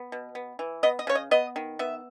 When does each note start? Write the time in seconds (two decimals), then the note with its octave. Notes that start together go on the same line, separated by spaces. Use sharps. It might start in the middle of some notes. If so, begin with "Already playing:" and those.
Already playing: B3
0.12 B2
0.35 B3
0.59 E3
0.83 B3 D#5
0.99 D#5
1.07 C#3 C#5
1.15 D#5
1.31 B3 D#5
1.56 D#3
1.79 B3 E5